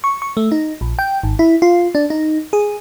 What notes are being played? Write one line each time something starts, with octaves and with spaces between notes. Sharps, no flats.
C#6
C#6
A3
D#4
A#1
G5
G#1
E4
F4
D4
D#4
G#4